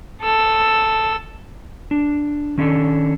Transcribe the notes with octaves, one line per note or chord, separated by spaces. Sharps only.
A4 E6
D4
D#3 C#4 D4 A4